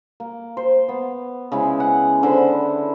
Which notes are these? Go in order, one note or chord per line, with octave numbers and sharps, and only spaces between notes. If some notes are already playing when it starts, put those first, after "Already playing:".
A#3
C5
B3
C#3 G#3 E4
F#5
D3 E4 C5 B5